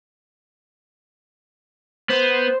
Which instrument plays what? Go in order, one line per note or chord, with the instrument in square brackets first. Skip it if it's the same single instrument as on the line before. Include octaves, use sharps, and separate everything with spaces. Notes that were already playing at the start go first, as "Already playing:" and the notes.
[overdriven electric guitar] B3 [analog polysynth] C5